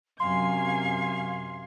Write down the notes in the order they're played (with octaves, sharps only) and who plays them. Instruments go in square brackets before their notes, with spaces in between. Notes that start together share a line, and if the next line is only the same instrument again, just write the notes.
[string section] F#2 [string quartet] C3 G#5 G#6 [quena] F5 [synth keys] C6